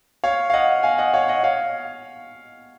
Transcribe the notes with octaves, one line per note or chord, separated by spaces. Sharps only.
C#5 F5
F5
D#5 F#5
F5 G#5
D#5 F#5
C#5 F5
D#5 F#5
C#5 F5